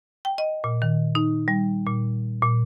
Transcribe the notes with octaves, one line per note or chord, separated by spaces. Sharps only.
G5
D#5
A#2
D#3
D#4
G3
A#2
A#2